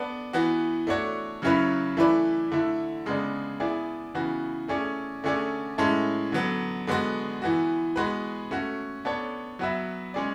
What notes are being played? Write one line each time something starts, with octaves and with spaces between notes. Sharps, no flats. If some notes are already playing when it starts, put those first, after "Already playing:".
Already playing: B3 D4 A4 D5
E3 B3 F#4
A3 D4 F#4 C#5
C#3 F#3 C#4 E4 B4
E3 A3 E4 B4 D5
D3 A3 E4
C#3 G#3 B3 D4
B3 E4 G#4 D5
C#3 E3 B3 F#4
A3 C#4 G#4 D5
D3 A3 C#4 G#4 D5
A2 G#3 C#4 E4 A4
D3 F#3 B3
D3 G#3 B3 F#4
E3 B3 F#4
G#3 B3 F#4 B4
A3 C#4 F#4
B3 D4 A4 C#5
F#3 B3 F#4 B4 E5
G#3 C#4 G#4 D5